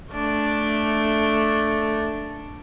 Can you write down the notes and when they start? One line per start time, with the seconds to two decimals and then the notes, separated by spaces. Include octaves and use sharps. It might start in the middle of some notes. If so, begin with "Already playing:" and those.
0.13 A3 D4